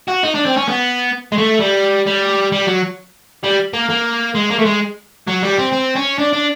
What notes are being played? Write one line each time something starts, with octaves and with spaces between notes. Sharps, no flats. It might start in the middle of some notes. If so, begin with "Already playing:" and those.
F#4
D#4
D4
C4
C#4
B3
G#3
A3
G3
G3
G3
F#3
G3
A#3
A#3
G#3
A#3
A3
G#3
F#3
G3
C4
C4
C#4
D4
D4